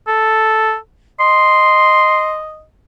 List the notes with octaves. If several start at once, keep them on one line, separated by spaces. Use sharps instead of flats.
A4
D#5 C6